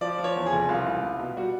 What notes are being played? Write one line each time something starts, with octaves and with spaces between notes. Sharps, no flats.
F3 D5
F3
C#5
E2
G#4
F1
C2 F4
C2
C2
B2
G3 F#4